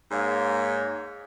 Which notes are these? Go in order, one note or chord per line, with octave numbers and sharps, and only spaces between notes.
G#2 A#3 C#5